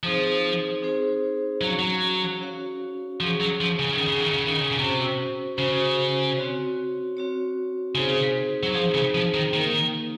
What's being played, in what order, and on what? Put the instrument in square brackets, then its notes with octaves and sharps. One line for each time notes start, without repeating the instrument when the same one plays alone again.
[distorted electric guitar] F3 [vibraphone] C4 D#4 G#4 C5
[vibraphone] C4 D#4 G#4 C5
[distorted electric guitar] F#3 [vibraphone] C#4 F#4 C#5 F5
[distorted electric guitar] F#3
[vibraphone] C#4 F#4 C#5 F5
[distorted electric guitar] F3 [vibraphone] C#4 G#4 C#5 F#5
[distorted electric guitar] F#3
F3
C#3
D#3
[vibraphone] C#4 G#4 C#5 F#5
[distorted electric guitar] C#3
D#3
C#3
D#3
C#3
C#3
[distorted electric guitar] C3 [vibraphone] C#4 F#4 C5
[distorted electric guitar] C#3 [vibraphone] C#4 F#4 C5
[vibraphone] C4 F#4 C#5
C4 F#4 C#5
[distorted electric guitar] C#3 [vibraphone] C4 D#4 G#4 C5
[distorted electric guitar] F#3
[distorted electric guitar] F3 [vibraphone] C4 D#4 G#4 C5
[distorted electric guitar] C#3
F3
D#3
[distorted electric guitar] D#3 [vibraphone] A#3 D#4 A#4 F5